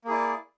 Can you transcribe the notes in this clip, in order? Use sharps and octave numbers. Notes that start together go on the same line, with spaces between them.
A#3 E4 G#4 D5